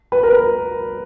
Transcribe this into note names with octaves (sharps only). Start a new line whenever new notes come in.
B4
A#4